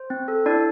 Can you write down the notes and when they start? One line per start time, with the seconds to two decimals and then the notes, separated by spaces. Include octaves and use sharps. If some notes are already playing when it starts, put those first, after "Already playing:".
Already playing: C5
0.10 C4
0.28 A4
0.46 D4 E4 D5